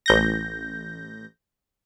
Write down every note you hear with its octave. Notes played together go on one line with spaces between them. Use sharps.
A1 G6 A#6